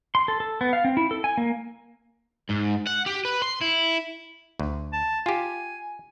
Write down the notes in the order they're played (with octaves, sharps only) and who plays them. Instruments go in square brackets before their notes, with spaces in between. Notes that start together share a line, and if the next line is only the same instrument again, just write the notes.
[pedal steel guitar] C6
A4
A4
B3
F5
C4
E4
A4
G#5
A#3
[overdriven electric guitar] G#2
F#5
G4
B4
C6
E4
[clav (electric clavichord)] D2
[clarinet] A5
[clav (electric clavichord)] F4 G4 [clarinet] G#5